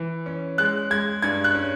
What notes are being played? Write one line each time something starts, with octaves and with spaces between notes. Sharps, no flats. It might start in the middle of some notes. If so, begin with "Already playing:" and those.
Already playing: E3
C#4
G#3 F#6
G#3 G#6
G2 G#6
F#6
C#4